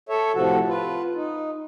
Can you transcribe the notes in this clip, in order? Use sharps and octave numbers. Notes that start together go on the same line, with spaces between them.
A4 C#5 E5
A2 C3 F3 F#4 A4
F4 B4
D#4